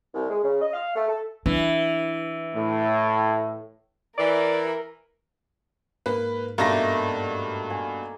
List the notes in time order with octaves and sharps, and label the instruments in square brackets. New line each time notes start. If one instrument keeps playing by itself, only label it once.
[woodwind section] C2
G#3
C#3
D#5
F5
A3
A4
[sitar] E3 [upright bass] D4
[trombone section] A2
[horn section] E3 [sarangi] A#4 [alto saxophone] D5
[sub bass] G#2 [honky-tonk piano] A#3 B4
[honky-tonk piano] G2 B2 A#6 [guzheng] A3 D#4 [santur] A#3
[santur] G#5